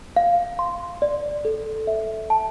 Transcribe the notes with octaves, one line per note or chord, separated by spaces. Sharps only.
F5
C6
D5
A4
E5
A5